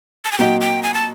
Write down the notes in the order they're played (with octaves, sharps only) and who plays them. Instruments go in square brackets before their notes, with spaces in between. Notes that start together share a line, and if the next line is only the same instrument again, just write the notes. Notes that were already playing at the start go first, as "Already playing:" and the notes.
[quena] A5
G#5
[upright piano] A#2 F#3 A#3 D#4 F#4 [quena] G5
[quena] G5
G#5
A5